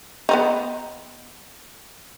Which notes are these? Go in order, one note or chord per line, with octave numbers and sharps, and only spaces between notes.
B3 C4 D#4